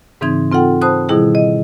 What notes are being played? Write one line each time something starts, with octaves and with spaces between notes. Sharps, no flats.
G#2 C#3 E3 C4 D#4 G#6
C4 F4 A4 F#5 G5
C5 A5 B5 D#6 F#6
B2 D#3 G3 E4 G#4
D#5